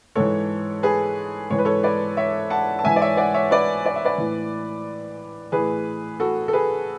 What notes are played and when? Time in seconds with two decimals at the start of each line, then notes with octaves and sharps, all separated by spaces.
0.15 G#2 E3 A4 C#5
0.83 G#4 B4
1.50 G#2 E3 C#5
1.58 B4
1.65 A4 C#5
1.83 B4 D5
2.17 C#5 E5
2.50 F#5 A5
2.79 A5
2.84 G#2 E3 E5 G#5
2.96 D5
3.01 C#5 E5
3.17 D5 F#5
3.34 C#5 E5
3.51 B4 D5
3.86 D5
3.96 E5
4.05 B4 D5
4.18 A2 E3
5.52 A2 E3 G#4 B4
6.20 F#4 A4
6.48 A4
6.53 G#4 B4